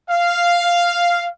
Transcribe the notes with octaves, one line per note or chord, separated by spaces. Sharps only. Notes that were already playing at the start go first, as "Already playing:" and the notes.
F5